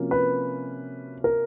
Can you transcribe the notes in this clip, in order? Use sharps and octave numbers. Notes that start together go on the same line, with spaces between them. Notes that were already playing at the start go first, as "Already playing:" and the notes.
Already playing: C3 F3 A#3 C#4 F#4
B4
A#4